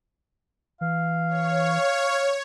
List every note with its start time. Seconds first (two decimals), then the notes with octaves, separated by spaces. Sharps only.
0.81 E3 F5
1.28 C#5